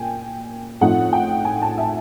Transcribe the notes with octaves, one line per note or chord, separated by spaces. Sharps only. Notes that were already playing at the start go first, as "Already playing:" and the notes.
Already playing: A#2 A#3 G5 G#5
A2 F3 A3 C4 D#4 F#5
G5
G#5
A5
E5